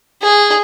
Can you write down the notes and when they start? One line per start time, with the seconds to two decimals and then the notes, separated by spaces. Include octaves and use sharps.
0.22 G#4